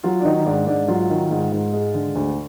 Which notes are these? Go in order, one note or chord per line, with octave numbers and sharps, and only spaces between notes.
F#3 F4
D4
D#3 D#4
G#2 D4
G#2 D4
F#3 F4
D#3
G#2
G#2
G#3
D3
D2